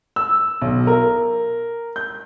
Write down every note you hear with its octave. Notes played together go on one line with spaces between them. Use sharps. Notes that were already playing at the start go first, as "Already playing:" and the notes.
E6
B1
A#4
G6